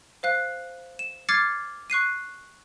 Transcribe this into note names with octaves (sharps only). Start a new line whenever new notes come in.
C5 F5 F#6
E7
D6 F6 G#6 A6 C7 C#7
C#6 F#6 C7 D#7